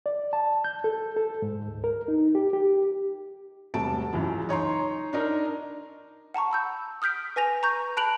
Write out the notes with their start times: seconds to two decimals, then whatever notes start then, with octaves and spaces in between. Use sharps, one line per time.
0.06 D5
0.33 A5
0.64 G6
0.84 A4
1.16 A4
1.42 G#2
1.67 D2
1.84 A#4
2.08 D#4
2.35 G4
2.53 G4
3.74 E1 C3 G3 A3 A5 D7
4.13 C#2 F#2 E3
4.49 D#4 C#5 A#5 C6
5.13 D4 D#4 A#4
6.34 F#5 A5 A#5 C#6
6.51 B5 E6 G6
7.02 D#6 F6 G6 B6 D7
7.36 B4 G#5 A#6 F7
7.63 A#5 C#6 G6
7.97 A5 B5 F#6 D7 F7 F#7